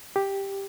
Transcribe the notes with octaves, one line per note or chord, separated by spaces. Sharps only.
G4